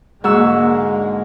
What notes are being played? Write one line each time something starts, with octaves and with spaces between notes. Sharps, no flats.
G#2 D3 G#3 A#3 F#4 E6